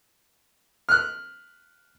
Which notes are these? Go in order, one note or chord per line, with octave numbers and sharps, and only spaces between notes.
F6 F#6